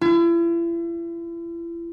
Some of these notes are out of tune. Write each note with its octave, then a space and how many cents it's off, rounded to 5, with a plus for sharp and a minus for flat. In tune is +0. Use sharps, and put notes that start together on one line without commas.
E4 +40